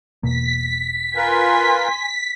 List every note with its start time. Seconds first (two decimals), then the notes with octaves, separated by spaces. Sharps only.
0.23 E1 B2 A#3 B6
1.16 F4 A#4 B4 G#5 C6